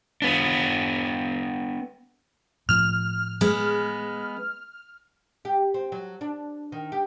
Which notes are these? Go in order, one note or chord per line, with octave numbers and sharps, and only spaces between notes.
B3 D4
A2 F3 F6
G#3 B3
G4
C4
F#3
D4
D#3
G4